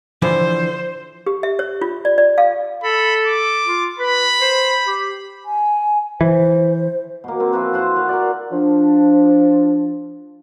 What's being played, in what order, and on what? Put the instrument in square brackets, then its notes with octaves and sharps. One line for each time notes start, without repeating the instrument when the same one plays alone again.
[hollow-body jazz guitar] D3 E3 F3 [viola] C5
[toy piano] G4
E5
C#5
F4
D5
D5
F5
[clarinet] A4 [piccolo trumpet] B5
[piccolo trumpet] D6
[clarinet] F4
[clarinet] B4 [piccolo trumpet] B5
[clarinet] C5
G4
[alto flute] G#5
[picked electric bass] E3 [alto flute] C5
[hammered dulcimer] B2 A#3
A#3 C4
F3 E4 F#4 B4
A4 C5 F#5 C6
F#4 F5 F#5
A#4 D5
[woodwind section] F3 D4